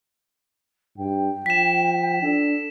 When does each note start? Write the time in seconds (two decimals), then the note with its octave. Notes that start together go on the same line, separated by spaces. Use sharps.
0.98 G2 G5
1.46 F3 B6 E7
2.22 D4 A4